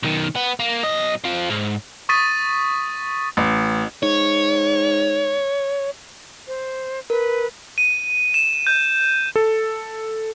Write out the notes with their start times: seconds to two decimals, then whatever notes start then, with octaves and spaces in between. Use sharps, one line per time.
0.03 B1 D#3
0.35 B3
0.59 A#3
0.83 B1 D#5
1.24 C4 F4
1.50 G#2
2.09 C#6 D#6 A6 B6 D#7
3.37 A1
4.03 G#2 C#5
6.47 C5
7.10 A#4 B4
7.78 D#7
8.34 E7
8.67 G6
9.36 A4